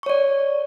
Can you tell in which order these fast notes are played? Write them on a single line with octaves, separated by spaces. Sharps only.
C#6 C#5 D5